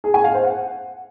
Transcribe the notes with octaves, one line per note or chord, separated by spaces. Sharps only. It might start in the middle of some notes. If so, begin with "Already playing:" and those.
G#4
G#5
F5
C5
F#5